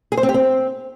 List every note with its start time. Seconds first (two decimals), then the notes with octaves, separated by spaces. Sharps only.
0.12 G#4
0.17 C5
0.23 C4
0.29 G4
0.34 C4